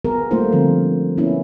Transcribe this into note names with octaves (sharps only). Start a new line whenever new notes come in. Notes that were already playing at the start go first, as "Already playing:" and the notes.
B3 G#4 A#4
G3 A3 A#3 D#4 F4 C5
D3 F3 C4 A#4
A#3 B3 C#4 E4